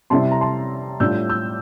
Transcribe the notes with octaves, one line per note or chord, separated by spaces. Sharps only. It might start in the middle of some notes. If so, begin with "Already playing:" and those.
C3 G3 C4 E4 A5 C6
A#5
A5 C6
A2 G3 D4 F4 E6 G6
E6 G6